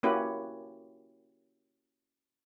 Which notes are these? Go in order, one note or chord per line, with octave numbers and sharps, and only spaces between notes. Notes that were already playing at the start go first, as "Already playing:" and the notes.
A#3 C#4 E4 F#4 G4 B4